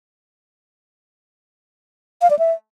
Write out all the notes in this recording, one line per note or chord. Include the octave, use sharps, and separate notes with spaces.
F5
D5
E5